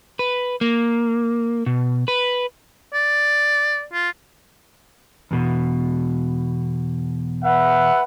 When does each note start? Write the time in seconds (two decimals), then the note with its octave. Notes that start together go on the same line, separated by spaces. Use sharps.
0.19 B4
0.61 A#3
1.66 B2
2.08 B4
2.94 D5
3.93 F4
5.31 E2 B2
7.45 B4 E5 F#5